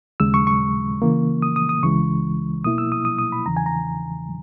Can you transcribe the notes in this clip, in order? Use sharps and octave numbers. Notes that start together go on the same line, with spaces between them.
D#2 C#3 G#3 E6
C#6
C#6
C#3 E3 A#3
D#6
D#6
D#6
C#2 C#3 E3 G#3 C#6
B2 A#3 E4 D#6
E6
D#6
D#6
D#6
B5
E2 C#3 E3 A#5
G#5
A#5